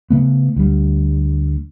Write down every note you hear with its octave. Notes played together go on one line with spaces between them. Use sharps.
C#3 A3 B3
D2 G3